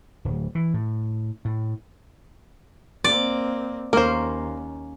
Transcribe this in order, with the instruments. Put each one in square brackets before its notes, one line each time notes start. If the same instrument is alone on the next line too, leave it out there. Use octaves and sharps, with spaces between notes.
[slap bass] D1
E3
A2
A2
[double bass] A#3 C4 [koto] D5
[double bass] D#2 [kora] A#3 C#4 [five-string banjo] A#4 C5